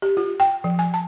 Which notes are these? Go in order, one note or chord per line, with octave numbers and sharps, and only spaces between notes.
G4
F4
G5
F3
G#5
A5